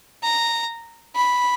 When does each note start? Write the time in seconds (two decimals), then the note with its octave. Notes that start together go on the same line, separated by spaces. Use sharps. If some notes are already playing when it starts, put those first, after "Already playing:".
0.23 A#5
1.15 B5